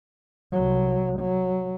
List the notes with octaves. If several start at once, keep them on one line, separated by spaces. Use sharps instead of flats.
C2 F#3
F#3